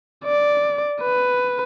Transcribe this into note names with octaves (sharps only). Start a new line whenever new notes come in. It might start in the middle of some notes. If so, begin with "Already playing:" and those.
D5
B4